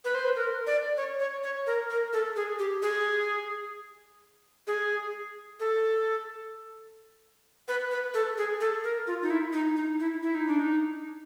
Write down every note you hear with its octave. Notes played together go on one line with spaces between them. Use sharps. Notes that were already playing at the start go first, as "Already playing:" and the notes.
B4
C5
B4
A#4
D5
C#5
C#5
C#5
A#4
A#4
A4
G#4
G4
G#4
G#4
A4
B4
B4
A4
G#4
A4
A#4
F4
D#4
E4
D#4
D#4
E4
E4
D#4
D4
D#4